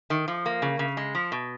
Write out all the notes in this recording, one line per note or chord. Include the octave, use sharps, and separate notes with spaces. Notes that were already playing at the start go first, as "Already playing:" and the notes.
D#3
F3
A#3
C#3
C#3
G#3
F3
B2